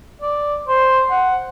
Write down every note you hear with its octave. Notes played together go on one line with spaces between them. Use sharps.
D5
C5
F#5